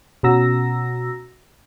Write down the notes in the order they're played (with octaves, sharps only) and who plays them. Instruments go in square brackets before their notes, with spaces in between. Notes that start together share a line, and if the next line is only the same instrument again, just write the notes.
[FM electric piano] B2 C#4 F#4 A#5 E6 A#6